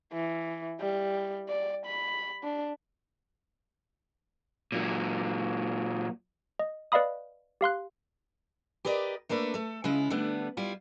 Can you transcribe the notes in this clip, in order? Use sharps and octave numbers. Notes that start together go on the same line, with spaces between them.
E3
G3
D5
B5
D4
A#2 F#3
D#5
B4 D5 D#5 F5 B5 D#6
G4 F5 C6 F#6
G4 A#4 B4 D5 D#5
A3 A#3 D4 A4 B4
A3 A4
C#3 G#3 E4 F4
D3 G3 A3 B3 D4
G3 E4 F4